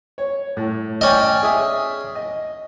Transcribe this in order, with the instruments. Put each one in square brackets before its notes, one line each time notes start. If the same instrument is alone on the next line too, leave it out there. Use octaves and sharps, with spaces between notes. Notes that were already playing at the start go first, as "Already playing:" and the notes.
[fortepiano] C#5
A2
[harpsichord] C#4 D#5 [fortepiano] D5 G5 G#5
[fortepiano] G#4 E5 D#6
D#5